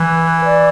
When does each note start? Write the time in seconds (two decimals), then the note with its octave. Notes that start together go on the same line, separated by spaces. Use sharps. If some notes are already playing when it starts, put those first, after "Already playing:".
Already playing: E3 B4
0.45 D5